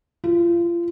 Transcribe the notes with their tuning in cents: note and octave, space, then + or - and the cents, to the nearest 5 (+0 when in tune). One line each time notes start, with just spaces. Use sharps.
F4 -30